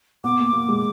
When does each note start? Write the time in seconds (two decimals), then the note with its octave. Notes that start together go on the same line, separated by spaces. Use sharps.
0.24 B3 D6
0.39 A#3
0.53 A#3
0.69 G#3